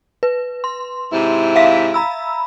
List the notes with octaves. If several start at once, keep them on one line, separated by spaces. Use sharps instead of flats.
B4
C6
G#2 C3 E4
E5 F5 B6
A#5 B5 E6